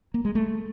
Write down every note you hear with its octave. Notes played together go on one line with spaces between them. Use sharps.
A#3
G#3
A3